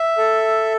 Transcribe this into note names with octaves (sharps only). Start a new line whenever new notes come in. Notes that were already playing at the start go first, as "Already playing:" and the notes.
Already playing: E5
A4